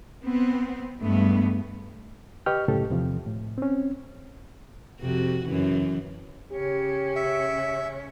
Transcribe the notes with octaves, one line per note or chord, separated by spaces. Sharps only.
B3 C4
G2 G#3 A3 B3
G4 B4 D#5 G5 C#6 F6
C2 F#2 A2 C#3 G4 A4
E2 C3 F3
A2
C4 C#4
F2 C3 F#4
F#2 C#3 E3
C#3 C#4 G4
E5